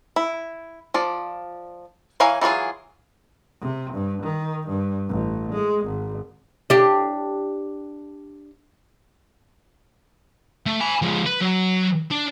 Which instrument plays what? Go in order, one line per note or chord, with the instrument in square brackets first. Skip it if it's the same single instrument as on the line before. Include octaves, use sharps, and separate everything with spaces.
[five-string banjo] E4
F3 F4 D5
E3 A#4 C#5 F5 G#5
E3 F#3 D4 F4 G#4
[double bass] C3
G2
D#3
G2
A1
G#3
G#1
[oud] D4 G4
[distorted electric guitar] A3
G#5 B5
F3 G#3
B4
F#3
D4